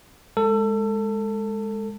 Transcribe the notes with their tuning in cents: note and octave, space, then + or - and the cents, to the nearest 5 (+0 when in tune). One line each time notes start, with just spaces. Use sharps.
G#3 +0 A4 +25